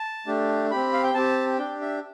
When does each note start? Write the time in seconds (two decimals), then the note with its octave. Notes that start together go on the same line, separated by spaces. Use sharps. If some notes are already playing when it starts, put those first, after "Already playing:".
Already playing: A5
0.27 A3 D4 G4
0.71 C4 G4 B5
0.93 F5
1.03 G5
1.14 C4 G4 A5
1.58 D4 G4 G5
1.81 E5